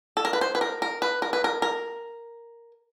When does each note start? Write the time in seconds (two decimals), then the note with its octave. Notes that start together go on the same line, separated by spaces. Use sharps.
0.17 A4
0.25 A#4
0.33 B4
0.41 C5
0.55 B4
0.61 A#4
0.82 A#4
1.02 B4
1.22 A#4
1.33 B4
1.44 A#4
1.62 A#4